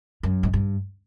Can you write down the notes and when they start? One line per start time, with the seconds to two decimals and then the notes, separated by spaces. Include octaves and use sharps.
0.23 F#2
0.43 G#2
0.53 G2